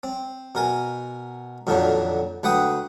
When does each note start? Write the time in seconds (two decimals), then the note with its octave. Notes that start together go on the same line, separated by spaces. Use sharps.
0.03 C4
0.55 B2 A#4 G#5
1.67 F2 A#2 D3 D#3 F3 F#3
2.43 D2 B4 F#5 G5 D#6